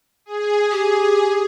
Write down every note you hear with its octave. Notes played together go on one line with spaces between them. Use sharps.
G#4
G4